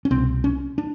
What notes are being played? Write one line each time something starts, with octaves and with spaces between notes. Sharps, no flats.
C#4
C2 B2 C4
C#4
D4